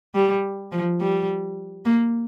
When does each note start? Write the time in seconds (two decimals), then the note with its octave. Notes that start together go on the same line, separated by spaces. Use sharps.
0.15 G3
0.72 F3
1.00 G3
1.85 A#3